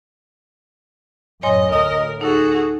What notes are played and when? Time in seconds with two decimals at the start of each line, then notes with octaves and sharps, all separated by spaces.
1.43 F#2 A2 C#5 D#5 G#5 C6
1.72 D2 A#4 D#5
2.21 D#4 F#4 G#4 A4